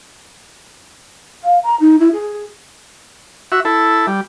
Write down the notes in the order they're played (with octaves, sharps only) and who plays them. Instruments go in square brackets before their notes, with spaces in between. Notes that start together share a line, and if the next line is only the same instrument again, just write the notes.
[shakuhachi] F5
A#5
D#4
E4
G#4
[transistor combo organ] F#4 E5
E4 A4
G3